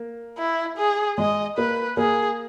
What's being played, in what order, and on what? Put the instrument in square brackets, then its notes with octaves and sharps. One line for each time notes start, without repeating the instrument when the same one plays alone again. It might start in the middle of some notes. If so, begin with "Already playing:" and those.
Already playing: [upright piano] A#3
[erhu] E4
G#4
[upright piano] G#3 [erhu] D#5
[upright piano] A#3 [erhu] B4
[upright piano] A#3 [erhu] G#4